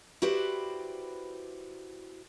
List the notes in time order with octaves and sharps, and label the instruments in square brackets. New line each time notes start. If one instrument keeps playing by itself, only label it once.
[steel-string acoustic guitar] E4 F#4 G4 B4 C5 D5